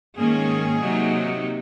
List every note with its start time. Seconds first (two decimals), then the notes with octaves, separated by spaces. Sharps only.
0.17 G#2 D#3 A#3 C#4 G#4
0.81 C3 F#3 A#3 D#4